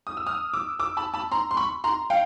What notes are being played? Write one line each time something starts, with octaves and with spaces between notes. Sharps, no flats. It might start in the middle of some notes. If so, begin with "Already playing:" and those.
D#6
E6
D#6 F6
D6 E6
D6 E6
A5 B5
A5 B5
A#5 C6
C6
B5 C#6
A#5 C6
F5 G5